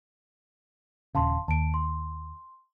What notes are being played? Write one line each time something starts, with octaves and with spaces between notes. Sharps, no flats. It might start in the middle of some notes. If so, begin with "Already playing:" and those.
D#1 C#3 F5 A5 C6
D#2 A5 D7
C6